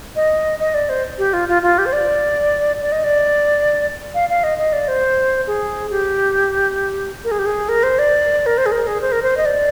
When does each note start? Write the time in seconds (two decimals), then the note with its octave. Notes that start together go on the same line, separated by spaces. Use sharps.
0.16 D#5
0.60 D#5
0.74 D5
0.89 C5
1.18 G4
1.33 F4
1.49 F4
1.63 F4
1.78 G4
1.86 C5
1.93 D5
2.81 D5
2.92 D#5
3.04 D5
4.14 F5
4.30 F5
4.44 D#5
4.58 D#5
4.73 D5
4.88 C5
5.47 G#4
5.91 G4
7.24 A#4
7.31 G#4
7.39 G4
7.46 G#4
7.69 A#4
7.83 C5
7.99 D5
8.46 A#4
8.58 C5
8.66 G#4
8.72 A#4
8.87 G#4
9.01 C5
9.12 A#4
9.22 C5
9.37 D#5
9.46 D5